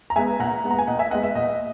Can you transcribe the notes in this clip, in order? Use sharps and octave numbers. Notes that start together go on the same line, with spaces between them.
A#5
G#3 B3 E5 G#5
A#2 F#5 A#5
G#3 B3
A#5
G#5
A#2 D#5 F#5
E5 G#5
G#3 B3 D#5 F#5
E5
A#2 D#5